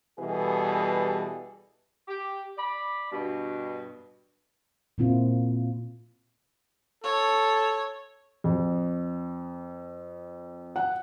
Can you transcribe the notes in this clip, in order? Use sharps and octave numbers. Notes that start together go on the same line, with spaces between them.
B2 E3 G3 G#4 A4
G4
D5 B5
G2 B2
A#2 A#3 C4 E4 F4
A4 C#5
F2
F#5